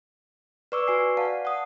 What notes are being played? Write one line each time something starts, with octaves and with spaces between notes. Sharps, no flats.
B4 D5 C#6 D6 E6
F#4 B4 G#5 C7
D5 F5 F#5 A5
F#5 D#6